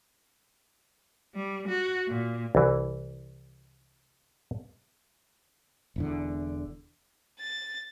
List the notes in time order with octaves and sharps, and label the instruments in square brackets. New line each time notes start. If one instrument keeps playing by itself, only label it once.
[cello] G3
F#4
A#2
[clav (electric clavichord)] C2 E3
[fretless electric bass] E1 E2 D3
[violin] A6